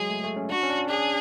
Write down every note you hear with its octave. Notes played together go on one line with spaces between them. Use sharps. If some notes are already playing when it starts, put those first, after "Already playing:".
Already playing: F#3 G#3 G#4
A3
A3
C#4
D4 F#4
C#4
D4
D4 G#4